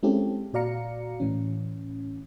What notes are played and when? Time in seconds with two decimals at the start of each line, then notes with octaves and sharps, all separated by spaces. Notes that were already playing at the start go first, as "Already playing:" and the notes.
0.03 G#3 C4 C#4 E4 G4 A4
0.53 A#2 F#4 D5 F5 A#5 C#7
1.20 A2 E3 C#4